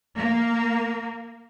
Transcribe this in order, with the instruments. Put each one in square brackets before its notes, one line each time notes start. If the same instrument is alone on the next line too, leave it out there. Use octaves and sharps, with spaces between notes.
[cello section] A#3